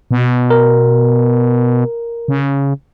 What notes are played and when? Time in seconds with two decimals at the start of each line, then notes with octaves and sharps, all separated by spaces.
0.11 B2
0.50 A#4
2.28 C#3